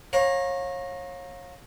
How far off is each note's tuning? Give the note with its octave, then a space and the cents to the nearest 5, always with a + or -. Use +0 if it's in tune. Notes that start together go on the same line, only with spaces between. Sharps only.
C#5 -25 F5 +30 A#5 +0